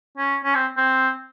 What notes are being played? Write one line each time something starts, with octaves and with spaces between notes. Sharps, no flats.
C#4
C#4
C4
C4